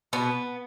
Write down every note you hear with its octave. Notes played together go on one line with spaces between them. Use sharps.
B2 B3